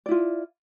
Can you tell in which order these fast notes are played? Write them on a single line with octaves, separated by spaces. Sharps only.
D5 E4 F4